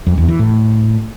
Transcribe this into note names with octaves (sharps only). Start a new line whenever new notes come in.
F2
E2
E3
A2